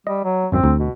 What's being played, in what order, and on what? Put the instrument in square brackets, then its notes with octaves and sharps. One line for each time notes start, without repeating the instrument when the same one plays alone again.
[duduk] G3 [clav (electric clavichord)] D#5
[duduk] F#3
[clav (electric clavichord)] G#1 F#2 [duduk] C4
[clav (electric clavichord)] D2
[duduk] B2